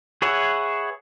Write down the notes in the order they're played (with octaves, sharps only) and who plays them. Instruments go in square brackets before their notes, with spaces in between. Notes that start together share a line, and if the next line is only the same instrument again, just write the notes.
[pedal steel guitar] G#4 B4 C#5 E5 F#5